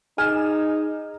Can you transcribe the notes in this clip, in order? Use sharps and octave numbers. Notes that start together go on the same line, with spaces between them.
D#4 G#4 G#5 F6 E7